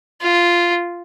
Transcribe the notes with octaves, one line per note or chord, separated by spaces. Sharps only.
F4